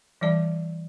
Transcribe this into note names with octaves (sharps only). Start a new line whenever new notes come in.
E3 G3 D5 A5